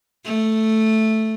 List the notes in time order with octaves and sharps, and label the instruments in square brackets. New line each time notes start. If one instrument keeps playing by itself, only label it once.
[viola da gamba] A3